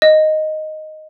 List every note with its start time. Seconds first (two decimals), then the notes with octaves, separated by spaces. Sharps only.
0.02 D#5